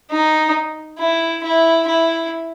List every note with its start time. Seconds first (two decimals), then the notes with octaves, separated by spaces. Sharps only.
0.10 D#4
0.99 E4
1.44 E4
1.87 E4